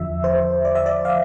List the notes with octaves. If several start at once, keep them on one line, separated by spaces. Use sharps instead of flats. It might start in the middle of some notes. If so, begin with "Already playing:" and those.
Already playing: E2 D3 F3 E5
C5
D5
E5
D5
F5